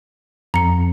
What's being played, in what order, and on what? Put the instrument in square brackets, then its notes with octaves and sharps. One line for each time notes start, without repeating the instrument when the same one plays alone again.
[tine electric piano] F2 [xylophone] A#5 C#7